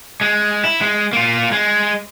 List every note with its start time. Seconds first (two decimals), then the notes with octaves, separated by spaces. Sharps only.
0.21 G#3
0.64 E4
0.81 G#3
1.13 A#3 F4
1.52 G#3